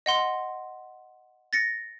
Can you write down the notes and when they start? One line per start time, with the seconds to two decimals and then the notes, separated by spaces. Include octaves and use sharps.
0.06 D#5 F#5 C6
1.53 A6 A#6 C#7